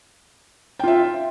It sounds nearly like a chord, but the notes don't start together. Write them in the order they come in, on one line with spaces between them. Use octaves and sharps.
G5 F4 E5